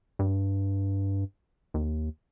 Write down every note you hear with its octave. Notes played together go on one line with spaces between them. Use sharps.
G2
D#2